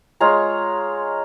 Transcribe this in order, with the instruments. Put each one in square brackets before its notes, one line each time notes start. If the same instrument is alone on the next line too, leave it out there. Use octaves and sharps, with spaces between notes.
[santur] G#3 F4 C#5 A#5